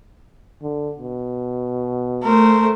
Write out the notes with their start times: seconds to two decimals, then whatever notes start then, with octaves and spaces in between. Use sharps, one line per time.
0.62 D3
0.98 B2
2.24 A3 A#4 C5